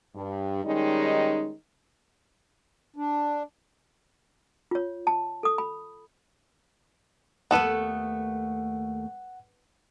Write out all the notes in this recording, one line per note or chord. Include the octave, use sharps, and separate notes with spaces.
G2
D#3 G3 G#3 C#4 D#4
D4
F4 C#5
A5
A4 D#6
B5
D#2 A3 B3 A4 B4 F#5